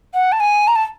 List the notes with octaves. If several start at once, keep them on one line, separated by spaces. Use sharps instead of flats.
F#5
A5
G#5
A#5
A5